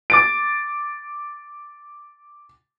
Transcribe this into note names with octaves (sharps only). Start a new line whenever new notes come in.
D6 A6 D7